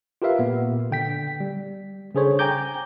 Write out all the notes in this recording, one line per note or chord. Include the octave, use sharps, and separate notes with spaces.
F4 G4 A#4 B4 E5 F5
A#2 B3
D3 G5 B6
G3
C#3 D4 G#4 A4 C5 C#5
G5 G#5 A#5 D6 G6